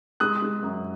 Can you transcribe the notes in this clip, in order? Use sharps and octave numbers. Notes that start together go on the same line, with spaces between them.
G#3 D#6 F#6
G#3
F#2